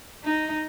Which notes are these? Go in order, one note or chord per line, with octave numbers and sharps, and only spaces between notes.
D#4